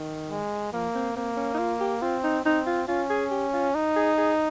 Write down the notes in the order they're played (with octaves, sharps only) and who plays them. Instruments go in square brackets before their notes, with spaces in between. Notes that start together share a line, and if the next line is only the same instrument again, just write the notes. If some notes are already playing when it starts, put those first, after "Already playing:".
Already playing: [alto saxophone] D#3
[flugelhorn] G#3
[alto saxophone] F3 [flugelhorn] A#3
[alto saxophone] C4
[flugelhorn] A#3 [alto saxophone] C4
[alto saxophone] C#4
D#4
F4
G4
[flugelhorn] C4 [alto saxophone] F4
[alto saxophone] D#4
[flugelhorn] C4 [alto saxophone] D#4
[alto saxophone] F4
[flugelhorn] C#4 [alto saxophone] F4
[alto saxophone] G#4
G4
F4
[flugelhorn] D#4
[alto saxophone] G#4
G#4